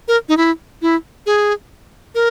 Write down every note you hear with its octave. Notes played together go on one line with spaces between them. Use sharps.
A#4
D#4
E4
E4
G#4
A#4